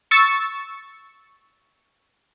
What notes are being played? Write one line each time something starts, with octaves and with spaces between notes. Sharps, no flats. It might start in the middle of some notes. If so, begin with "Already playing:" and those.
C#6 E6 A6 C#7